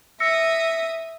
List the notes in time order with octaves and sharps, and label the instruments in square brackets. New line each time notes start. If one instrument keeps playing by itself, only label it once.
[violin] E5 D#6 [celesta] E6 A#6 C#7